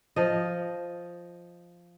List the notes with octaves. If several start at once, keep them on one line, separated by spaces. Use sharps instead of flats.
F3 D#5